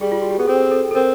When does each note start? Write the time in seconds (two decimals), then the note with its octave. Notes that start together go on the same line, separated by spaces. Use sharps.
0.01 G3 G#4
0.12 F4
0.22 F#4
0.31 G4
0.38 B3 G#4
0.47 C4 A4
0.71 A4
0.91 A4
0.95 C4 A#4